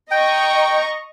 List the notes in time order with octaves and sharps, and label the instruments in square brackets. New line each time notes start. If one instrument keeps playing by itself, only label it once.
[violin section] D#5 A#5 C#6 [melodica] G5